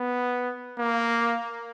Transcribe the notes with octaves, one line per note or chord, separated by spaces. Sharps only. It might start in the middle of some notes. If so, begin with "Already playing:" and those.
Already playing: B3
A#3